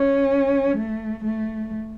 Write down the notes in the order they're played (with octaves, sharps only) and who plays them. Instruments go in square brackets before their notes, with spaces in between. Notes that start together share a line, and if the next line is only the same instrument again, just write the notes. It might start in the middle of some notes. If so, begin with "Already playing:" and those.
Already playing: [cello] C#4
A3
A3